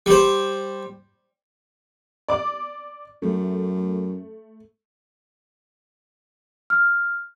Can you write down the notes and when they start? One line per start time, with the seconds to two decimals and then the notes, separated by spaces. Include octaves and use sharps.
0.06 G3 C5
2.28 D5 D6
3.22 F#2 A3
6.70 F6